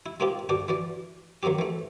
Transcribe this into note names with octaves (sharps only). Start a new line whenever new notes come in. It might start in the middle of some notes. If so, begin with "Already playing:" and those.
E4
C3 A#3 C4 D#4 F4 G4
G2 D3 D4 F#4 D6
E3 F#4 D5
D#3 F#3 A#3 C4 G4
E3 A3